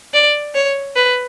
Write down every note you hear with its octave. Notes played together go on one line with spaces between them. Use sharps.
D5
C#5
B4